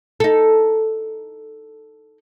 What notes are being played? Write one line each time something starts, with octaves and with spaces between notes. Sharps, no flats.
D#4 A4